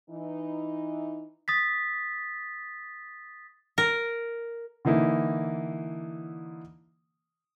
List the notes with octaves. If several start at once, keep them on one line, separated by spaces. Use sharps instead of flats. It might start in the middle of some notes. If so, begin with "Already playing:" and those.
E3 D#4
D#6 A6 B6
A#4
D3 E3 A#3 D#4 E4